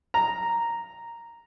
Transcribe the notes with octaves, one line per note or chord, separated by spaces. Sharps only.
A#5